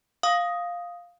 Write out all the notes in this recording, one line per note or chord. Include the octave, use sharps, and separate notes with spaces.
F5 D#6